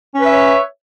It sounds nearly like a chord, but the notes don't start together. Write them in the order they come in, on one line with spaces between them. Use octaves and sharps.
C#4 B4 E5 C#5